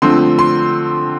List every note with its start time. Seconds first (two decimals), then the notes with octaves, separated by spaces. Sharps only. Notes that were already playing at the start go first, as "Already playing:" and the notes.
0.02 D3 F3 A3 C4 C6
0.39 C6